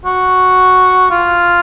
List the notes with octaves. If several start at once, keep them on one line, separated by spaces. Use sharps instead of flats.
F#4
F4